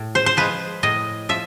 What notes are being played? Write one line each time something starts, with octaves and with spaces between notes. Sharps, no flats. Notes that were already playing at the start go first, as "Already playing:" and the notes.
Already playing: A2
C5
C5
F3 G#3 B4
A2 D#5
F3 E5